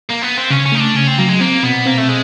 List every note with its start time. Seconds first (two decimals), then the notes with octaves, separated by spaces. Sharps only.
0.10 A#3
0.23 B3
0.37 C4
0.50 C#3 C#4
0.66 C#4
0.72 A3 D#4
0.80 D4
0.95 C#3 C#4
1.07 C4
1.18 F#3 A#3
1.30 G#3
1.40 A#3 C4
1.63 B2 B3
1.86 A#3 C4
1.97 A3
2.08 G#3